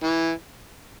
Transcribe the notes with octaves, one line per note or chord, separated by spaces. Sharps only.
E3